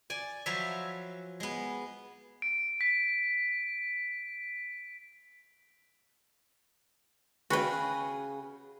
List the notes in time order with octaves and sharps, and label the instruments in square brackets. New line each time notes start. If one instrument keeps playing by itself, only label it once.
[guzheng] D5 G#5
F3 F#3 B4 C#5 E5
G#3 B3
[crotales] D7
B6
[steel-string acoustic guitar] C#3 G#4 [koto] F#4 B4 G5